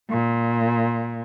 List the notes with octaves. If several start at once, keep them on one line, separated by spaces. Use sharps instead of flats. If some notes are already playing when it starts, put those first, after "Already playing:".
A#2